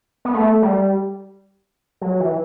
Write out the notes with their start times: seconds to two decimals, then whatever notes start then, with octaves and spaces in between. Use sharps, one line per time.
0.25 B3
0.34 A3
0.62 G3
2.01 F#3
2.20 E3